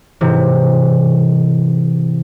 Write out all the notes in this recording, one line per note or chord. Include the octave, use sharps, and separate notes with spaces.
G#2 C3 E3